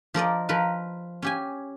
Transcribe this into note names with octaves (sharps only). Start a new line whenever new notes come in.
F3 A#4 D5 D#5
F3 A#4 B4
C#4 G4 G#5